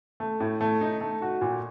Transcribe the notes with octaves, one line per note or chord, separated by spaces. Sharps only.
A3
A2
A3
D#4
A3
F#4
A#2